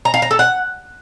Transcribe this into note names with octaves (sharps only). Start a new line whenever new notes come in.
A#5
F5
A#5
A4
F#5